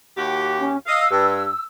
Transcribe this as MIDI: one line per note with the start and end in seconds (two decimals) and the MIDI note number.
0.17 0.73 39
0.17 0.73 66
0.17 0.73 67
0.58 0.76 61
0.86 1.05 75
0.86 1.05 77
0.86 1.64 88
1.11 1.48 43